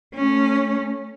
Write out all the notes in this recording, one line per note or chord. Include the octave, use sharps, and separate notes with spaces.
A3 C#4